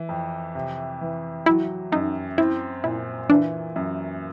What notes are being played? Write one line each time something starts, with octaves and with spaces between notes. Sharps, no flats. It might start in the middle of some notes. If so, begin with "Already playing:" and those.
Already playing: E3
F2
C3
E3
F#3 E4
F#2 D#4
C4 E4
A#2 E4
E3 D4
F#2